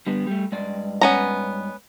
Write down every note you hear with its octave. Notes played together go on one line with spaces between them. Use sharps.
D3 G3 B3
G3 A3
G2 G#3 D5
B3 C#4 A#5